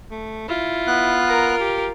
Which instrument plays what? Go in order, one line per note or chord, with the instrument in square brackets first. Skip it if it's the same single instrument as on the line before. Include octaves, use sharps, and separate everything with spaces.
[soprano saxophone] A3
[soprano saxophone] E4 [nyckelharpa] F4
[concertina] B3 F#6
[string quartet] A#4 [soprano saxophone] A#5
[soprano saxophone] G4